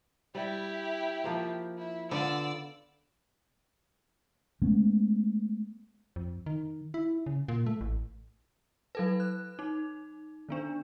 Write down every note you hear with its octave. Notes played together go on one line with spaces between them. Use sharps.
G3 E4 G4
F3 A#3 C5
E4
D3 B3 F4 D5 E6
G#3 A3 B3 C#4
F2
D#3
E4
C#3
A#2
A3
A1
F#3 A4 B4
F#6
D#4
D#3 B3 D4